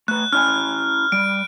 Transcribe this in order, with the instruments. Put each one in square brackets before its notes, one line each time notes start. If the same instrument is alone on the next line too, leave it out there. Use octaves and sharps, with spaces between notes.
[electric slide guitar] A3 B4 [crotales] F#6
[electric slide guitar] C#4 E4 G#5 [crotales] F6
[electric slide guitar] G3 [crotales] D7